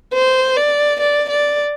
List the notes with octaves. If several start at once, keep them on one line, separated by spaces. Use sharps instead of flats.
C5
D5
D5
D5